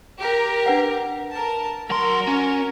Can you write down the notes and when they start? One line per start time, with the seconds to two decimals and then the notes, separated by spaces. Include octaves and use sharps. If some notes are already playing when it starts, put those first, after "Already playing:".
0.19 G4 A#4 A#5
0.66 D4 B4 F#5
1.30 A#4 A5
1.90 F#3 F#4 A#4 C6
2.27 C#4